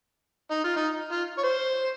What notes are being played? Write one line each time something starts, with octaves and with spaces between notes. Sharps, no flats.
D#4
F4
D#4
F4
C#5
C5